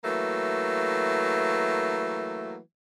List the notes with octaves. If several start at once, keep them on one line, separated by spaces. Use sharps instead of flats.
E3 F#3 A3 A#3